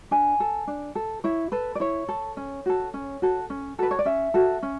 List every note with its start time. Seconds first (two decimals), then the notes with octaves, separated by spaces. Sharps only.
0.11 D4 G#5
0.40 A4
0.67 D4
0.95 A4
1.24 E4 C#5
1.52 A4 B4
1.75 D5
1.80 E4 C#5
2.09 A4
2.37 C#4
2.66 F#4 A4
2.94 C#4
3.22 F#4 A4
3.50 C#4
3.79 F#4 A4 B4
3.91 C#5
3.99 D5
4.05 C#4 E5
4.34 F#4 A4
4.63 C#4